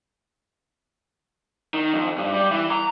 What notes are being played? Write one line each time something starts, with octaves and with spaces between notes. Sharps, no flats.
D#3
F2
G2
G3
E3
A#5